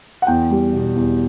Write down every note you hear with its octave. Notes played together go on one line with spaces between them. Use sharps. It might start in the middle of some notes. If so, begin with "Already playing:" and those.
F#5
E2 G5
G3
B2
E2